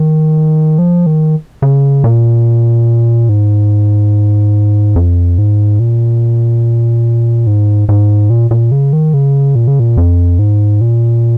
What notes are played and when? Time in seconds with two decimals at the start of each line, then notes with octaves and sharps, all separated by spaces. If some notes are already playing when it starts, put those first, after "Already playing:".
Already playing: D#3
0.79 F3
1.06 D#3
1.62 C#3
2.04 A#2
3.29 G#2
4.96 F2
5.38 G#2
5.79 A#2
7.47 G#2
7.89 G#2
8.30 A#2
8.51 A#2
8.72 C#3
8.93 D#3
9.14 C#3
9.55 A#2
9.67 C#3
9.80 A#2
9.97 F2
10.39 G#2
10.81 A#2